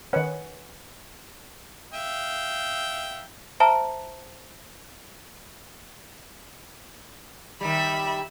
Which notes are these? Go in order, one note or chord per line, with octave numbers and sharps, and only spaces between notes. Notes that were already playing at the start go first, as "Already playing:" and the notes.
D#3 C#4 B4 F#5 G#5
E5 F5 G5
C5 E5 A5 A#5
D#3 G3 E5 B5